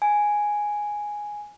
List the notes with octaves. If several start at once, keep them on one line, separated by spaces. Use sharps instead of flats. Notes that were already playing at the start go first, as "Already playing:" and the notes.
G#5